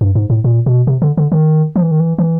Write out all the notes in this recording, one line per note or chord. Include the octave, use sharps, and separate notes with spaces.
G2
G#2
A2
A#2
B2
C3
D3
D3
D#3
F3
E3
D#3
E3
E3